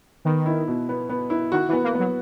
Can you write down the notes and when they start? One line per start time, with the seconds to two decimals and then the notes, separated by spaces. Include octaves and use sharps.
0.25 D#3 B3
0.46 E4
0.68 B2
0.89 B3
1.09 B3
1.30 E4
1.52 D#3 F#4
1.68 E3
1.73 B3
1.84 A#3
1.95 F#3 B3